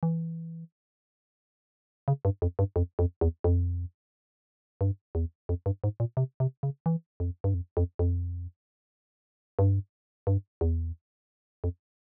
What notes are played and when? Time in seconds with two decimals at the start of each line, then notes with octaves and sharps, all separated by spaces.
0.03 E3
2.08 C#3
2.25 G2
2.42 F2
2.59 G2
2.76 F2
2.99 F2
3.21 E2
3.44 F2
4.81 G2
5.15 E2
5.49 F2
5.66 G2
5.84 G#2
6.00 A#2
6.17 C3
6.40 C3
6.63 C#3
6.86 E3
7.20 F2
7.44 G2
7.54 F2
7.77 F2
7.99 F2
9.59 G2
10.27 G2
10.61 E2
11.64 F2